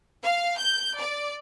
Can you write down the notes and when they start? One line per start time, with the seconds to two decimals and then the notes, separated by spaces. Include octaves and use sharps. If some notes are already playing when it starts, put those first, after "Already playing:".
0.23 F5
0.57 G6
0.99 D5